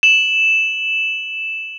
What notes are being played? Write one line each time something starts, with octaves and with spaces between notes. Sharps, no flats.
E7 F#7